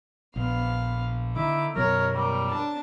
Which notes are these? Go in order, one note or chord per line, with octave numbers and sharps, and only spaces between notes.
A#1 B3 F5
D3 D#4 E4 D6
F#2 B2 F#3 A#4 C#5
G3 A#4
D4 A5